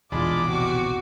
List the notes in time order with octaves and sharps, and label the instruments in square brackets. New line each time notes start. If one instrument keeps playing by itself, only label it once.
[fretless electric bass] E1 A#1 E2 [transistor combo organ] G#3 D4 B5 [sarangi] F4 [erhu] D6
[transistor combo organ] C3 [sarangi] F#4